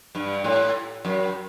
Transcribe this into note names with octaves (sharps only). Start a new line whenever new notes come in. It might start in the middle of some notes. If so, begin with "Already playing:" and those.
G2
A2
F#2